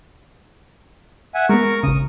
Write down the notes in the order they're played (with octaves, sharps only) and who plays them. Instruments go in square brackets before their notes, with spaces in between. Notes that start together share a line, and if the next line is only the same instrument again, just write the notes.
[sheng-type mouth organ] E5 F#5 G#5
[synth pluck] G#3 B3 [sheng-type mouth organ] A#4 C#6
[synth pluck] A1 C#3 [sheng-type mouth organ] D#6